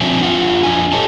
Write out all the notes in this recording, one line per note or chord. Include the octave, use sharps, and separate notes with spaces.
F3 C4 D4 E5 G5 G#5
D4 F4 F#5
F2 D4 G#5
G4 A4 C#5 D#5 A5